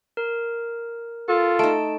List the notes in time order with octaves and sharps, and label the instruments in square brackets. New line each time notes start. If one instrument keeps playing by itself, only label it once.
[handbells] A#4
[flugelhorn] F4 [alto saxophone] A4
[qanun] A3 D#4 [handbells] A5 D7